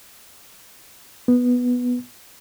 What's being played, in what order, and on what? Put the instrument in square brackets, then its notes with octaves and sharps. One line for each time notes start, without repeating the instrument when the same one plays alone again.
[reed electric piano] B3